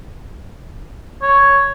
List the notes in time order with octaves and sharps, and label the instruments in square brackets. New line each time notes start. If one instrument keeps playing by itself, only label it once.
[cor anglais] C#5